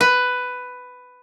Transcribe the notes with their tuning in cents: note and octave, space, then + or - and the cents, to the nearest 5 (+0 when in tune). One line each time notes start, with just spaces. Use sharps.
B4 +10